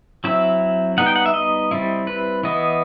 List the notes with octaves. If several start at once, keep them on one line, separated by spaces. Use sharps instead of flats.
F#3 C4 E4 E5
G3 B3 D#4 F#5
G5
F#5
E5
D#5
G3 C4 E4
B4
E3 B3 E4 D#5